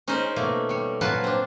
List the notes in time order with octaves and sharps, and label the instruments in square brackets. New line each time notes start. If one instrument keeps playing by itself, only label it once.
[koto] C#4 D#4 G#4 A#4 C5
B2 A3 A#3
G3 C#5
A#2 F#3 F4 B4 G#5 A5
C4 D4